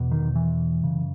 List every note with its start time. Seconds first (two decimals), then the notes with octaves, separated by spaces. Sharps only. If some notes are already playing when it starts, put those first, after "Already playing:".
Already playing: E2 B2
0.11 D#3
0.35 E3
0.83 F#2 C#3